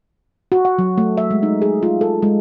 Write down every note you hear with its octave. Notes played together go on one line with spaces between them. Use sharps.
F#4
F#5
F#3
A3
E5
G#3
D#4
G#4
F4
A4
G#3